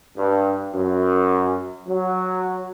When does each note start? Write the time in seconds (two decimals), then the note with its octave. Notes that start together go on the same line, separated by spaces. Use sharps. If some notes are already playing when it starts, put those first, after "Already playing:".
0.17 G2
0.73 F#2
1.88 F#3